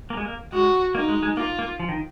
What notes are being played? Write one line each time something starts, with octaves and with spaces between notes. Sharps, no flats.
A#3
G#3
A#3
G#3 F#4
A#3 D#4
G#3
G#3
A#3 F4
A#3
F3
D#3